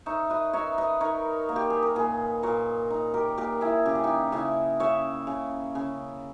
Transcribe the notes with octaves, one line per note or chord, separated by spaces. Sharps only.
D#4 C#5 E5
B4 D#5
D#4 C#5 E5
B4 D#5
D#4 A#4 C#5
A#3
G4
G#4
A#4
A#2 G#4 B4
A#2 A#4 C#5
D#4
G4 A#4
A#2 G4 A#4
E4 G#4
C#3 G4
G#4
D#4 G4
C#3 E4 G#4
C#3 C#5 E5
C#3
C#3